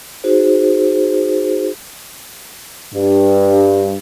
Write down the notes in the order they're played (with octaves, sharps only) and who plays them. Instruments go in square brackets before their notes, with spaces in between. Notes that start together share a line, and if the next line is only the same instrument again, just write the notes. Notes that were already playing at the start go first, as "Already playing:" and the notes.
[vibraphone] D#4 F#4 G#4 C5
[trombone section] G2